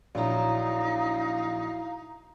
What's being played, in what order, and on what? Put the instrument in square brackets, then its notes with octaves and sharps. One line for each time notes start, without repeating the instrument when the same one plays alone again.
[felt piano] A#1 [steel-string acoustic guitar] F#3 E4 [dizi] D#4 [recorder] F5